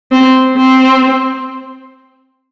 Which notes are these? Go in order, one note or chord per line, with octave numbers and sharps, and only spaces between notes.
C4
C4